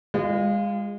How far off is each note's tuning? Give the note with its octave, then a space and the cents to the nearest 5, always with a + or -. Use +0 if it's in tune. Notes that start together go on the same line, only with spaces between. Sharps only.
G#3 -30 F4 +0